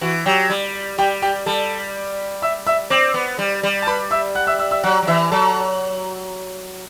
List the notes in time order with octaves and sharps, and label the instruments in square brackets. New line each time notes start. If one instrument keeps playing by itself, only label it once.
[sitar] E3 [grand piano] F#4 F#5
[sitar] F#3 [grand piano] G4 G5
[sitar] G3
[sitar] G3 [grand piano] G4 G5
[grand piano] G4 G5
[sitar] G3 [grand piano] A4 A5
[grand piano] E5 E6
E5 E6
[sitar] C4 [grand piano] D5 D6
[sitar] B3
G3
G3
[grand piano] A5
B4 B5
E5 E6
F#5 F#6
E5 E6
E5 E6
E5 E6
[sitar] F#3 [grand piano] F#5 F#6
[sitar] F#3
[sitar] E3 [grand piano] E5 E6
[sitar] F#3 [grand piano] A4 A5